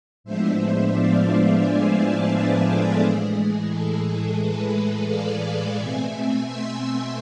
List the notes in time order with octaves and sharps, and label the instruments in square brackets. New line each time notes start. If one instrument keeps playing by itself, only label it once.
[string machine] A2 F3 G#3 B3 D4 C5 E5
D5 F5
E5 G#5
F5 A5
G#4 B4
A4
A2 E3 G#3 G#4
A4
G#4 B4
D5 F5
B2 A3 C4 E5 G#5
C6 E6